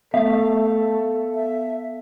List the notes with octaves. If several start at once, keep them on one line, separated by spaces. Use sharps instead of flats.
A3 B3 A4 E5 F5
E5